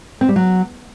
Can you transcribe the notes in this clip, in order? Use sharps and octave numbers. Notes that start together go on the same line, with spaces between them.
C4
G3
F#3